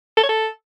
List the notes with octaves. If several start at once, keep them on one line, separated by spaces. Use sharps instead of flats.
A4
C#5
A4